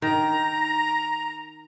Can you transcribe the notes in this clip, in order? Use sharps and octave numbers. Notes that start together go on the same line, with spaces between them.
D#3 A#5